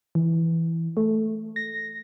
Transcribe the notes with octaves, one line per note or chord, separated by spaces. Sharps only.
E3
A3
A#6